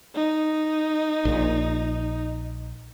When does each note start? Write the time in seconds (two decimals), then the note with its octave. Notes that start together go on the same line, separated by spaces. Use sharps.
0.16 D#4
1.25 A#1 A#2